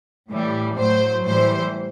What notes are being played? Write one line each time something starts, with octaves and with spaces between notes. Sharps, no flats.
A2 E3 G3
A2 F#3 C5
A2 E3 G3 C5